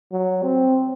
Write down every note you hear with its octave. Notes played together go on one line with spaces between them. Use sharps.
F#3
C4